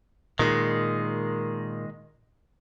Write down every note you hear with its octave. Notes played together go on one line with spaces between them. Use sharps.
A#2 D#3 G#3